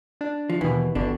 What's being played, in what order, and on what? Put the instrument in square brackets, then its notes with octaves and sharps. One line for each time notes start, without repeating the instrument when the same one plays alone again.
[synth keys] D4
[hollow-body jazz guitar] F3
[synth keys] D#2 B2 [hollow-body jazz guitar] E3
[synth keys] G1 [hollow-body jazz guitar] B2 D3 D4